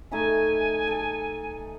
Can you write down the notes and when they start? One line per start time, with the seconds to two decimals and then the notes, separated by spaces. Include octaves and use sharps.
0.11 A3 D#4 E5 G#5
0.87 A4